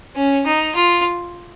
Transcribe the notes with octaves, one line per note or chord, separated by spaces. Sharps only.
C#4
D#4
F4